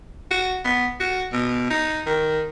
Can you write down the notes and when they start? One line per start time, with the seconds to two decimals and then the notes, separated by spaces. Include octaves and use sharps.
0.31 F#4
0.65 B3
1.00 F#4
1.33 B2
1.71 D#4
2.06 D#3